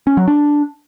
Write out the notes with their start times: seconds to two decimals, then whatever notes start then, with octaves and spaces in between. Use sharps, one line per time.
0.07 C#4
0.17 F#3
0.28 D4